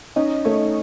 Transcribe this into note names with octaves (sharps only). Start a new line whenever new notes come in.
C#4 D#4 D#5
A3 C#5